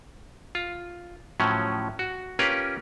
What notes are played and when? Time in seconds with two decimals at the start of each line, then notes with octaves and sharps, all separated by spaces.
0.55 F4
1.40 A2 F3 F#3 C#4
1.99 F#4
2.39 A#3 C#4 F4 G4 A#4 B4